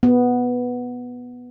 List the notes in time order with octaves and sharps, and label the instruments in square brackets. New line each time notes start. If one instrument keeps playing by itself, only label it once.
[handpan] B3